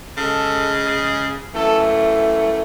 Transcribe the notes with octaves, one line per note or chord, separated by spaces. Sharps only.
C#3 G#3 A4
G#4
F#2 E3 A3 A4